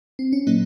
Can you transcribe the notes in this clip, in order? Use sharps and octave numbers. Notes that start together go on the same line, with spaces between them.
C4
C#4
A#2 F#3 A#3 D#4